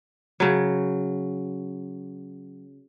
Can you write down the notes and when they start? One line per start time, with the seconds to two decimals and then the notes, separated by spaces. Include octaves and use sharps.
0.40 C#3 F#3